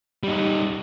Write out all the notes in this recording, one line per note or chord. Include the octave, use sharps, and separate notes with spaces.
G3 D#4